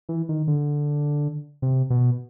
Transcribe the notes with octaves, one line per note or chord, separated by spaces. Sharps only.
E3
D#3
D3
C3
B2